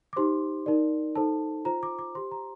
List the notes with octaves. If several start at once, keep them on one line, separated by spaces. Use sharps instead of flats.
D6
D#4 G4 C5 C6
D#4 A#4 D5
D#4 A4 C5 A5
F4 C5 A#5
D6
D6
G4 C5 C6
A#5